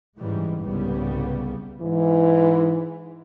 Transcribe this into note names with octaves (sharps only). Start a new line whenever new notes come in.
G#2 C#3 E3 G3 G#3
C2 G#2 C#3 G3 B3
G#2 E3